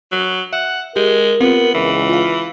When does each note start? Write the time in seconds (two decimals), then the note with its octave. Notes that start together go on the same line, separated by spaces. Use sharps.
0.12 F#3
0.53 E5 F#5
0.96 G#3 G4 A#4
1.40 B3 C4 F4
1.74 C#2 E3
2.09 F4 F5